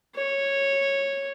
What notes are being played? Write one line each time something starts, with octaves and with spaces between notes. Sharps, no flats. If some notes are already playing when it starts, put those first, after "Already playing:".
C#5